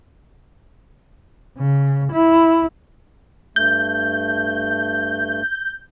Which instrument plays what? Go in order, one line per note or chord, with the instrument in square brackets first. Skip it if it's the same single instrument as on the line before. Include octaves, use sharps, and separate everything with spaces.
[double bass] C#3
E4
[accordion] G2 A3 [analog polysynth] G6